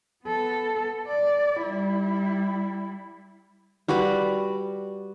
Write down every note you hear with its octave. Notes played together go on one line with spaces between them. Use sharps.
B3 A4
D5
G3 E4
G3 F#4 B4 D5